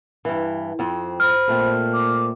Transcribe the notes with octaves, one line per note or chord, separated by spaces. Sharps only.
G2 E3
F2 C4
C5 B5 F6
A#2 A3 C4
D6